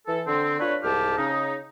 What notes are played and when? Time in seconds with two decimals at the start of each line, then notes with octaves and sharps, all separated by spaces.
0.07 E3 A4
0.27 D3 C4
0.60 D4 F4 B4 C#5
0.84 C2 G#2 G4 A5 F6
1.18 C#3 D#4